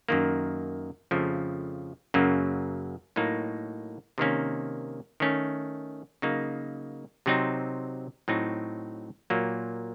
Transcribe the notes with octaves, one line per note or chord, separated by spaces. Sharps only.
F#2 D#3 A#3
F2 C#3 F3 A3
F#2 C#3 F#3 A#3
A2 F#3 A#3 D#4
C3 D#3 A#3 C#4
D#3 A3 C#4
C#3 F#3 A#3 D#4
C3 F#3 C4 D#4
A2 F#3 C4 D#4
A#2 F#3 A#3